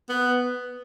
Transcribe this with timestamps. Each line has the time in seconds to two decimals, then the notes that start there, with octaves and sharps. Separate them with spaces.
0.09 B3